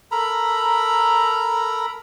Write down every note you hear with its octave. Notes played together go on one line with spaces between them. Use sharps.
A4 A#4 A#5 B5